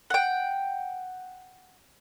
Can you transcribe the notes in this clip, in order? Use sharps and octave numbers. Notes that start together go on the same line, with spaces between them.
F#5 G5